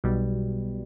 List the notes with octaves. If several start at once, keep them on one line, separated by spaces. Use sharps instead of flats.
B1 B2 G3